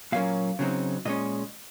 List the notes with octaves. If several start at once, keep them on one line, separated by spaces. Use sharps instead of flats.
A#2 F#3 A#3 C#4 F5
C#3 F#3 C4 D#4
A#2 G#3 C#4 D#5